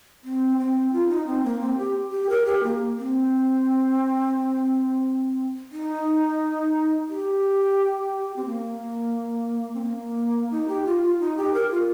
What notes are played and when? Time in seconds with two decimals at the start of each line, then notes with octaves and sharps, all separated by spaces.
0.23 C4
0.58 C4
0.93 F4
1.09 D#4
1.27 C4
1.44 A#3
1.61 C4
1.78 G4
2.12 G4
2.29 A#4
2.46 G4
2.63 A#3
2.97 C4
5.72 D#4
7.09 G4
8.36 C4
8.46 A#3
9.74 C4
9.82 A#3
10.51 D#4
10.68 G4
10.85 F4
11.03 F4
11.20 D#4
11.37 G4
11.54 A#4
11.71 F4